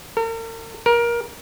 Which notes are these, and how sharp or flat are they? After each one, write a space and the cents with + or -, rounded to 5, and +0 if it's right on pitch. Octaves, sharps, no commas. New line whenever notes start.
A#4 -45
A#4 +20